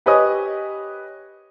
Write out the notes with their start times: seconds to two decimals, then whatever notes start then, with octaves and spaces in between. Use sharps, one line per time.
0.06 G4 B4 C#5 D#5 G#5 D#6